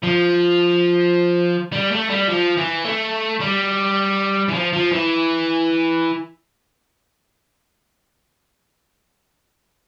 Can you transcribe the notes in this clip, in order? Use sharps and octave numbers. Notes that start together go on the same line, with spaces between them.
F3
G3
A3
G3
F3
E3
A3
G3
E3
F3
F3
E3